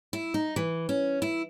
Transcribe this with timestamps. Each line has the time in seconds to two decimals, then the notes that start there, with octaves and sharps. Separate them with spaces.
0.13 E4
0.34 D#4
0.56 E3
0.89 C#4
1.22 E4